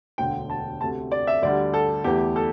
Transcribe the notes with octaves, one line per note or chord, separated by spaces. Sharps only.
E1 D2 D3 G5
A5
D2 C3 A3 A5
D5
E5
D2 D3 G3 D5
A4
E2 E3 A3 G4
A4